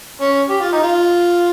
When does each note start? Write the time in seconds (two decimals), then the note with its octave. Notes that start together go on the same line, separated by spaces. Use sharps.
0.21 C#4
0.50 G4
0.61 F4
0.73 D#4
0.83 F4